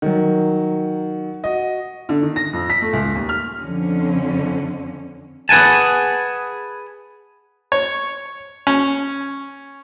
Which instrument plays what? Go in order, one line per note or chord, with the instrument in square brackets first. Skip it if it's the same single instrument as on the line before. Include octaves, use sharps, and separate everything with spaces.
[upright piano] D#3 F#3
F#4 D#5
D3
D#3
A#6
F2
B6
A3
C#2
D#2
F6
[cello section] F2 D3 C#4
[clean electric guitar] G#4 B4 F#5 G#5 A5
[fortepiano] C#5
C#4